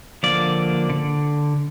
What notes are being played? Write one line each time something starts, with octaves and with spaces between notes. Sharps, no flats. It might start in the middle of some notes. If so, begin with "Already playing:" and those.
D3 F3 A#3 D5
D3